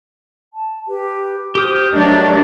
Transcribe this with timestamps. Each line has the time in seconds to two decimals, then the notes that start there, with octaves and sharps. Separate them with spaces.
0.53 A5
0.88 G4 B4
1.55 G4 C5 D#6 F6 G6
1.92 F#3 A3 D4 A#4 D#5